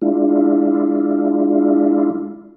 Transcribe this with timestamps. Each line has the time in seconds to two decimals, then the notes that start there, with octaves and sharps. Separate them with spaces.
0.02 G#3 D4 E4 F4